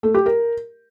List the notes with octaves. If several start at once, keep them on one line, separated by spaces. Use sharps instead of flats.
A3
G4
A#4